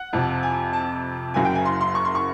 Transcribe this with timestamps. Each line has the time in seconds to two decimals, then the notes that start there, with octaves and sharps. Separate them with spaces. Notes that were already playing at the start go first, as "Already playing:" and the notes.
Already playing: F#5
0.13 F2 C3 F3
0.43 G#5
0.73 A5
1.34 F#1 F#2 C#3 F#3 G#5
1.45 G5
1.55 G#5
1.65 C6
1.81 C6
1.95 C#6
2.05 C6
2.15 C#6